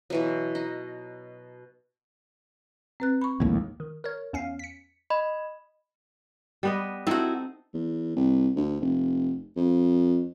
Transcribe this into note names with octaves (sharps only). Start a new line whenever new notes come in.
B2 E3 F#3
D#4
C4 B4 F#6
B5 C#6
A#1 D#2 A2 G#3
D#3
A#4 C#5
E2 C#4 F5
B6 C#7
D#5 B5
G3 B3 D#5
C4 D#4 E4 F#4 A4
E2
C2
D2
F1
F2